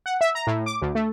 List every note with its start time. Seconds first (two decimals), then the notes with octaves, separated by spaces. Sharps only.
0.06 F#5
0.21 E5
0.35 A#5
0.47 A2
0.66 D6
0.82 D2
0.95 A3